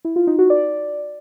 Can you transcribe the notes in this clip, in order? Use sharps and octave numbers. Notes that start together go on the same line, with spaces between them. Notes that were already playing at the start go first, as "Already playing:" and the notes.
E4
F4
D#4
F#4
D5